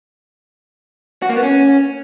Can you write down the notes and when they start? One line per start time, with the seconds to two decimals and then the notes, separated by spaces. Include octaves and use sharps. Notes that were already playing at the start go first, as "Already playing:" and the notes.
1.22 F#4
1.29 A#3
1.36 B3
1.43 C#4